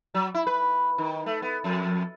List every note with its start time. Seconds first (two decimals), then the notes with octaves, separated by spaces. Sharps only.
0.14 F#3
0.34 E4
0.47 B4
0.98 D#3
1.26 A3
1.42 B3
1.64 F2